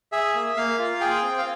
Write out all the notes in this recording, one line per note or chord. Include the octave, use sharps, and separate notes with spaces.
G#4 E5
A#3
A#3 F5
F4
G#4 G5
C4
F5